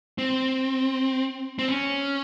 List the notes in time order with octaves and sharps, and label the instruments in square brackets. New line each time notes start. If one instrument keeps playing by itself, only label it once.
[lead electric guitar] C4
C4
C#4